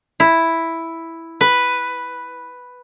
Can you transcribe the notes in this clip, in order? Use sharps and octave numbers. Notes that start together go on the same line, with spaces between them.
E4
B4